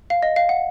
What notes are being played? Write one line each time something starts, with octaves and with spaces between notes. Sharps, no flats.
F5
D#5
F5
F#5